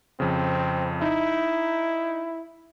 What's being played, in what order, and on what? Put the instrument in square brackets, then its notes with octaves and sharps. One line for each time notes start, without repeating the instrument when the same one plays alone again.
[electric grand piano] F2 C#3 [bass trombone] C4
[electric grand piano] D#4 [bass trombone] E4